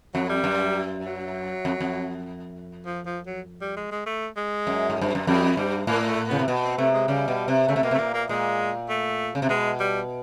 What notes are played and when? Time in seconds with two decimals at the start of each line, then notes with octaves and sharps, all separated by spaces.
0.14 F2 F#3
0.29 G3
0.44 F#2
1.05 F#3
1.65 F2
1.81 F2
2.86 F3
3.06 F3
3.26 F#3
3.61 G3
3.76 G#3
3.91 G#3
4.06 A3
4.37 G#3
4.67 F#2
4.90 G#2
5.01 G2
5.15 F#2
5.27 F2 G3
5.57 G2 G3
5.87 A2 A#3
6.07 A3
6.28 C#3 B3
6.39 C3
6.48 B2
6.63 C4
6.78 C3 A3
6.93 G#3
7.08 C#3 G3
7.28 B2
7.48 C3
7.68 C#3 A3
7.76 C3
7.83 B2 A#3
7.91 C3
7.94 A3
7.98 A#2 A#3
8.14 A#3
8.29 A#2 G#3
8.89 A3
9.35 C#3
9.42 C3
9.49 B2 G#3
9.80 G3